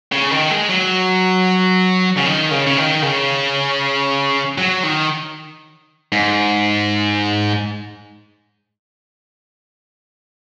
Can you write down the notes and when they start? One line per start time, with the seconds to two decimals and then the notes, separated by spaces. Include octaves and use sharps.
0.12 C#3
0.31 D#3
0.51 G#3
0.70 F#3
2.17 C#3
2.25 D#3
2.51 C#3
2.66 C#3
2.77 D#3
3.02 C#3
4.58 F#3
4.83 D#3
6.12 G#2